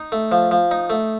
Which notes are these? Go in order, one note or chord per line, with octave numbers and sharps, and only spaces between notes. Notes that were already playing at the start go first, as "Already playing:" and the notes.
Already playing: D#4
A3
F3
F3
D#4
A3